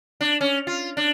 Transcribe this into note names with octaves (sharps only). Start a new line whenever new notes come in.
D4
C#4
F4
D4